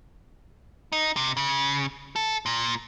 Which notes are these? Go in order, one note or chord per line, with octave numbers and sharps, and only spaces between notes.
D#4
C3
C#3
A4
A#2